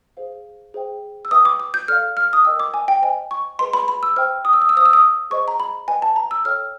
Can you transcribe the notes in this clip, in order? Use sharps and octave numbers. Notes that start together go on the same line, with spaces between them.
G#4 C5 F5
G#4 C5 E5 G5
E6
B4 E5 G5 D#6
D6
D6
G6
A4 D5 F5 F6
F6
D#6
A#4 D#5 G5 E6
D6
G#5
G5
C5 D#5 G5 G#5
C#6
G#4 B4 D#5 C6
B5
B5
E6
C5 E5 G5 F6
D#6
E6
D#6
E6
C5 F5 D#6
E6
D#6
G#4 C5 D#5 C#6
A#5
B5
B4 D#5 G5 G#5
A5
A#5
E6
A4 C#5 E5 G5 F6